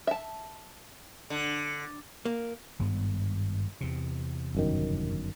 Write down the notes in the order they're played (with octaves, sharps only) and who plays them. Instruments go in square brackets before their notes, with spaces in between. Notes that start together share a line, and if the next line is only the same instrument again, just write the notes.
[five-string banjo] E5 A5
[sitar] D3
[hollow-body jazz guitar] A#3
[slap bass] G#1 G2 B3
E2 C3
[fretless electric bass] G1 F#2 D#3